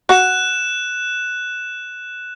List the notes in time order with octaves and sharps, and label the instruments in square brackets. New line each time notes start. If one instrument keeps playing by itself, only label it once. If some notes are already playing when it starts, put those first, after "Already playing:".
[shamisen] F#4 F#5 [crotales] F#6 E7